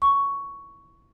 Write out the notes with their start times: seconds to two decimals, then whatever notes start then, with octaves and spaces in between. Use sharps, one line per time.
0.02 C#6